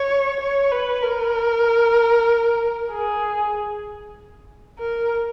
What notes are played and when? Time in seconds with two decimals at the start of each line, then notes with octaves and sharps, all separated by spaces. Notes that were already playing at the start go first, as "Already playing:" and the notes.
Already playing: C#5
0.40 C#5
0.72 B4
1.03 A#4
2.91 G#4
4.79 A#4